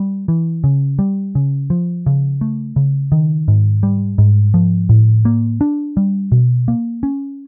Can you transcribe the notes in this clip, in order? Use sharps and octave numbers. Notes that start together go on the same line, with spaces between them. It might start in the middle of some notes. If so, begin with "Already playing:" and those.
Already playing: G3
E3
C#3
G3
C#3
F3
C#3
A3
C#3
D#3
G#2
G3
G#2
F3
A2
A#3
D4
G3
B2
A#3
C#4